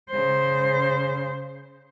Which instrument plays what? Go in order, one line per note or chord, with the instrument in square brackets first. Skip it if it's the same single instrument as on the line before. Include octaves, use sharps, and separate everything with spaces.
[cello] C#3 C5